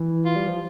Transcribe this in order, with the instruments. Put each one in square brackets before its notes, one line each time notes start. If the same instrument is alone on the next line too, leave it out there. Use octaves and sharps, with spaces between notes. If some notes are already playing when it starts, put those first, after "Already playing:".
Already playing: [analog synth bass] E3
[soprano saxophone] F4
[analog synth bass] G3
F3